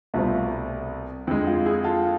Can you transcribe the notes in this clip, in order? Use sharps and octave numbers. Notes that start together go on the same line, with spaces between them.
C2 B2 A3 C4 F4
F2 D3 G#3 E4
F4
E4 G#4
F4 A4